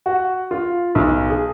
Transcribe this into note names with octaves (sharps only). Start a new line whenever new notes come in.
F#4
F4
B1
G#4